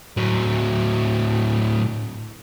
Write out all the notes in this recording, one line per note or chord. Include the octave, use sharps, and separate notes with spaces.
A2 F#3